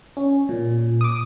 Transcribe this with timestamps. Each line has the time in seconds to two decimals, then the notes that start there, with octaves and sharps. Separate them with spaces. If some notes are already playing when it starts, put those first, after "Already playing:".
0.17 C#4
0.49 A#2
1.01 D6 D#6